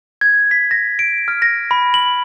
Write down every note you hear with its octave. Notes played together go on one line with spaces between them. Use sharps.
G#6
B6
A#6
D7
F6
A#6
B5
F#7